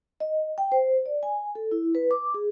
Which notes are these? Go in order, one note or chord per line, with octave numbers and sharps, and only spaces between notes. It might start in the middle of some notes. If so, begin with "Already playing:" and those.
D#5
G5
C5
D5
G#5
A4
E4
B4
D6
G#4